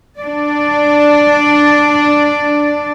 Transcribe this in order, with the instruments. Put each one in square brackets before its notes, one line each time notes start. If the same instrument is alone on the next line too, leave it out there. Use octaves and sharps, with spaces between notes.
[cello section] D4 D5